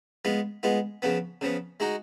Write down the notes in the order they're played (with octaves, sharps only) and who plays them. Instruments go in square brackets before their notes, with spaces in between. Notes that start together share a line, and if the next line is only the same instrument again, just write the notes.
[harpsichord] G#3 B3 F4
G#3 B3 F4
C#3 F3 B3
C#3 F3 B3
G#3 D#4 F#4